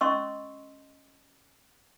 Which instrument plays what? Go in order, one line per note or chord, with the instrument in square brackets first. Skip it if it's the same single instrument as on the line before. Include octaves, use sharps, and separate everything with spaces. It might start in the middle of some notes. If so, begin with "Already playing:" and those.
[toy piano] C#4 D#5 C6 C#6 E6